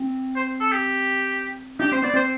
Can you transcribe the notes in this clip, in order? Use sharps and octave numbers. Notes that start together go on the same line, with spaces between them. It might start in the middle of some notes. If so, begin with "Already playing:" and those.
Already playing: C4
C5
A4
G4
D4 G4
C4 C5
B3 D5
C4 C5